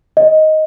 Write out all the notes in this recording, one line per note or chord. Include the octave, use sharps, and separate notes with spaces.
D#5